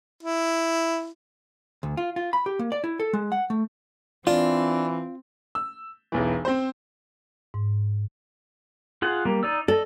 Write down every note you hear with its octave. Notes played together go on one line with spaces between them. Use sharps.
E4
D2
F4
F4
B5
G4
A#3
D5
E4
A4
G#3
F#5
A3
E3 C4 D4 F4
E6
E1 B1 E3
C4 C5
G#2
F4 G#4 F#5
G3 A#3
D#4 D5 E6
A4 D5 D#5